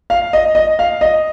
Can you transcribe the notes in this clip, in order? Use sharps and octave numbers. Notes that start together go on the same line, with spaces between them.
F5
D#5
D#5
F5
D#5